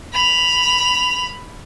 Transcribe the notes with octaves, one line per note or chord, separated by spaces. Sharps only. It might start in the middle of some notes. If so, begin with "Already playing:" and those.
B5 F7